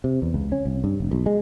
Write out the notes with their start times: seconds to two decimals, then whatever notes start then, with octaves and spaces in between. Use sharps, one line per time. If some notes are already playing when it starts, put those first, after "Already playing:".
0.04 C3
0.22 E2
0.34 C#2
0.52 C#4
0.65 C2
0.84 G2
1.00 F1
1.11 B1
1.26 G#3